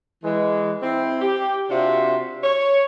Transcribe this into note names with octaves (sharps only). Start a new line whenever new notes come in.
E3 G#3
C4 E4
G4
C3 D4 F4 F#4 E5
C#5